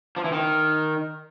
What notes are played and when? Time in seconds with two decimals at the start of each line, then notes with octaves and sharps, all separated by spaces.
0.16 F3
0.24 E3
0.32 D#3